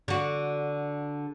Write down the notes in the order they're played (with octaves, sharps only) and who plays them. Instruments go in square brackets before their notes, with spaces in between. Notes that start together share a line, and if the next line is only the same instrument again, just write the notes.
[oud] D3 F#4